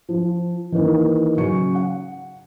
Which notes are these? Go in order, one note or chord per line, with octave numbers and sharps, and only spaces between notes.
F3
D#3 E3 A#3 D#4
C#3 F#3 C#4 C#6 C#7
F#5